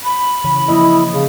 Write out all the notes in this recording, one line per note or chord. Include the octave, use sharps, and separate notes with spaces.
B5
C#3 E3 C#5
F3 A#3 E4 D#5
C#3